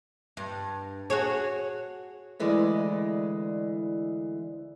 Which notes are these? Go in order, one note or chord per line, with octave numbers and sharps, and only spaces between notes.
G2
F#4 G#4 C#5
D2 E3 G#3 D5 D#5